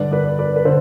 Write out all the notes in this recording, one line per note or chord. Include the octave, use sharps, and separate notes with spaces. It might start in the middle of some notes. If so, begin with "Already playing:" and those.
Already playing: G2 D3 B4 D5
B4 D5
B4 D5
B4
D3 C5